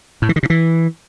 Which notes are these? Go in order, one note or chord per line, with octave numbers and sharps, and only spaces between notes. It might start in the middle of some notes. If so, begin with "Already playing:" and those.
A2
E3
D#3
C3
E3